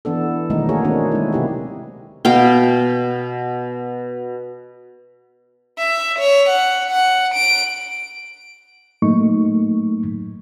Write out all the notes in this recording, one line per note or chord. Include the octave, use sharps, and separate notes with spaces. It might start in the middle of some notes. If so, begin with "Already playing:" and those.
E3 B3 D4 A4
B2 D#3 F#3 G#3 A3 D#4
A#3 F#4 G#4 A#4 C#5
D#3 A#3 C4 D4
G#3 E4
C3 E4 G4
B2 F5 G5
E5
C#5
F#5
F#5
D7
A2 F#3 A3 A#3 D#4 C#6